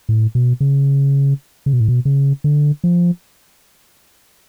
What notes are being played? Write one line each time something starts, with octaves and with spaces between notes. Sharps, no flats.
A2
B2
C#3
C#3
B2
A2
B2
C#3
D3
F3